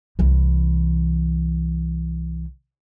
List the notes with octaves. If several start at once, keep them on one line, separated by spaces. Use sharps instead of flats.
C2 E3